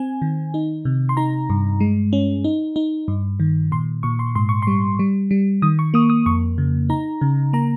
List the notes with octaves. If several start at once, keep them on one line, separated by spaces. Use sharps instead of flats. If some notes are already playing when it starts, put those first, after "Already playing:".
Already playing: C4 G#5
D#3
D#4
C3
C6
D#4 A#5
G2
G#3
C#4
D#4
D#4
G2
D#3
A#2 C6
A#2 C#6
C6
G#2 C6
C#6
G3 C6
G3
G3
D#3 D#6
C#6
A#3 D#6
D#6
F2 C#6
C#3
D#4 A#5
C#3
A#3 A#5